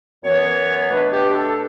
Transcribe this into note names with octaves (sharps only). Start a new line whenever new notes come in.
F#2 E3 B3 C#5
B2 A3 D4 B4
G4
A4